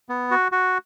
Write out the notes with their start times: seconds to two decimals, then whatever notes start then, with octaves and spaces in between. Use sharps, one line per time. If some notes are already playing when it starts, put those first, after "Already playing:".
0.09 B3
0.31 F#4
0.52 F#4